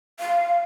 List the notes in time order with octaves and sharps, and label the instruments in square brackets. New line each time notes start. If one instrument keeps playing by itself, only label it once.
[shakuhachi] F5